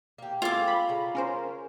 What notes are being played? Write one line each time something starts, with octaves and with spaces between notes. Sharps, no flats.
A#3 G4
G#3 C4 F4 A4 D6
B5
C#3 A#5
C#4 A#4 C5